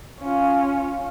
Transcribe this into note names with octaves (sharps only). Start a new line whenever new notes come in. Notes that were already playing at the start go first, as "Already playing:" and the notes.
C#4 F4